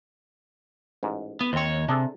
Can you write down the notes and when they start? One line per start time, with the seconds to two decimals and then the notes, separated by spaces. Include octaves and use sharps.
1.03 A1 G#2
1.41 B3
1.53 D#2 C4 C5 C#5
1.88 C3 D4 G#4 A4